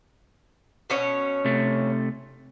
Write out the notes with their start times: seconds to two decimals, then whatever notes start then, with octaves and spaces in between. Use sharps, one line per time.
0.90 B2 C#4 C#5
1.45 C3 A3